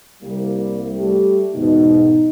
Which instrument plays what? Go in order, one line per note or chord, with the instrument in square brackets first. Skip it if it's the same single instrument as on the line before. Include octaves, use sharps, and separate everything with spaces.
[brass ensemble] C2 [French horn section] G3 A#3
[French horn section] G3 A3 G4
[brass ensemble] E2 G#2 B2 [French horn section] D#4